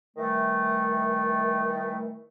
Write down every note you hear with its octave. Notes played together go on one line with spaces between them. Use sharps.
D#3 E3 G3 A3